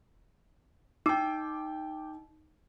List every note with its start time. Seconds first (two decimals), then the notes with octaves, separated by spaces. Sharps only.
1.06 D#4 G5 D6